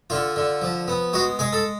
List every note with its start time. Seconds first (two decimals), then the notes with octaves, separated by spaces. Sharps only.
0.10 D3 F4
0.36 D3
0.62 F3
0.88 B3
1.13 G#3 F#4
1.39 G#3 G#4
1.53 A4